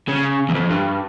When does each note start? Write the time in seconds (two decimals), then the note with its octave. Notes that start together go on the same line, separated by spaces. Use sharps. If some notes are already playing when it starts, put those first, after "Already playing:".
0.08 C#3
0.49 E2
0.55 F2
0.70 G2